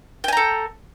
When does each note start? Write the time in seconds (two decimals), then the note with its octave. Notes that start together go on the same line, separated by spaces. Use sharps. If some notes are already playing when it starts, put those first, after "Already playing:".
0.24 G5
0.28 G#5
0.33 A#5
0.37 A4